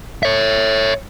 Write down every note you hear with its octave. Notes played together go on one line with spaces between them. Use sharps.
C#5 E5